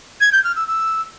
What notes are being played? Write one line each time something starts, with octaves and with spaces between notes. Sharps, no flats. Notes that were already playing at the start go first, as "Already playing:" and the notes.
G#6
G6
F6
E6
E6